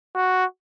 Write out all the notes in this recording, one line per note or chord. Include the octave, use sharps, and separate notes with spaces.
F#4